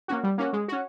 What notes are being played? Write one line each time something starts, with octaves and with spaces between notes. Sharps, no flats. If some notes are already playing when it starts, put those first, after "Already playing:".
A#3 C#4 F#4
G3
A#3 C#4 F#4
G#3
C#4 F#4